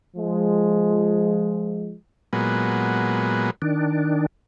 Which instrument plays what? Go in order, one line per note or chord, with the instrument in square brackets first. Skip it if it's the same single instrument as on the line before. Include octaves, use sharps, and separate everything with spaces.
[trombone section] F3 G#3
[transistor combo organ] A#2 F#3 G#3 B3
[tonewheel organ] D#3 D4